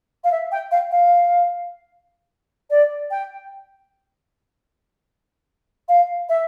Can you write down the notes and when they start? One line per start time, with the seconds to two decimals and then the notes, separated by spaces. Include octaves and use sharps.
0.24 F5
0.32 E5
0.52 G5
0.71 F5
0.91 F5
2.70 D5
3.11 G5
5.89 F5
6.29 E5